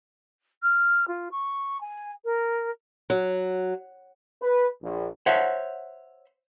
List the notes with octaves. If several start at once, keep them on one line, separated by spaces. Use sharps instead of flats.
F6
F4
C#6
G#5
A#4
F#3
B4
A#1
C5 C#5 E5 F#5